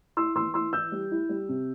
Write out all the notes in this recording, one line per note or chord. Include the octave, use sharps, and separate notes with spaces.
E4 C6 E6
E3 C6 E6
E4 C6 E6
E3 E6 G6
G3
E4
G3
C3